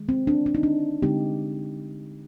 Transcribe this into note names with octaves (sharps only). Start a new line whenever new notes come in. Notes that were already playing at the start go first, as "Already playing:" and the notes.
Already playing: D#3 G#3
C4
D4
D4
D#4
D4
D3 G#3 C4 D#4 G4